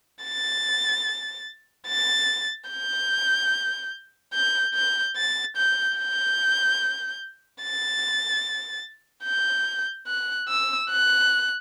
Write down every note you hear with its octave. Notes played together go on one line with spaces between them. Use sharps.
A6
A6
G6
G6
G6
A6
G6
G6
A6
G6
F#6
E6
F#6